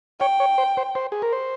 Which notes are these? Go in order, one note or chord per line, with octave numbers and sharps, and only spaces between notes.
C#5 G5
C#5
C5
C5
C5
G#4
A#4
C5